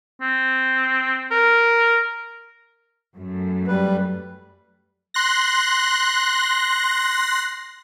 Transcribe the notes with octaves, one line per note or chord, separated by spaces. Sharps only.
C4
A#4
F#2 A3
G3 B4
C6 F#6 A#6